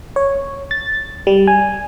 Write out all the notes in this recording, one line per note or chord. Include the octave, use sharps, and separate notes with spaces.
C#5
A6
G3
G#5